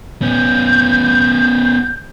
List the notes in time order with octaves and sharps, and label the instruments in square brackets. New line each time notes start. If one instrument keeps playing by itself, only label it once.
[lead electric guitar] B3 C#4 [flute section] G6